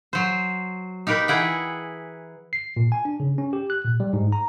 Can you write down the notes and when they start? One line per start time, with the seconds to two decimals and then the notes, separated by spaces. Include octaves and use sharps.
0.13 F#3 C5
1.07 D#4 G4 A#4 B4
1.28 E3 E4 G#4 F#5 G5
2.53 C7
2.77 A#2
2.92 G#5
3.05 D4
3.20 C#3
3.38 C#4
3.53 G4
3.70 F#6
3.84 A#2
4.00 G3
4.13 G#2
4.32 A#5